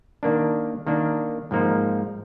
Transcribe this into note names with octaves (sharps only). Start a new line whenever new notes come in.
D#3 A#3 D4
D#3 A#3 D4
G#2 F3 A#3 D#4